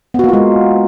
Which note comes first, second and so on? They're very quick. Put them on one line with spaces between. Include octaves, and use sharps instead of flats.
B3 F#4 A#3 F4 G#3